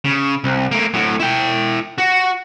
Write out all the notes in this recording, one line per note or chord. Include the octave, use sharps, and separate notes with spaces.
C#3
C2
A3 A#3
A2 F#3
E4 G5
F#4